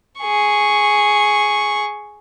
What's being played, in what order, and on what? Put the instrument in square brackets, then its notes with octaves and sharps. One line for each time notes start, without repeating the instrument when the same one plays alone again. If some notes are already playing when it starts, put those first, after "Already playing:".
[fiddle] G#4 C#6